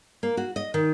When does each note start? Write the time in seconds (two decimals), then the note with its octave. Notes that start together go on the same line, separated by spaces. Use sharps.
0.23 A#3
0.37 F#4
0.56 D#5
0.74 D#3